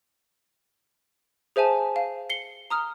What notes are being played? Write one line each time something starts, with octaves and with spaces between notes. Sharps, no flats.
G#4 C5 E5 G#5 A5
F5
C7 C#7 G7
A#5 D#6 F6